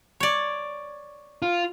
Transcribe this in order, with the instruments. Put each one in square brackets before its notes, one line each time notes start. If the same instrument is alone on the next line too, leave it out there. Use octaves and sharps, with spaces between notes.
[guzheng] C#5 D5
[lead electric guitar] F4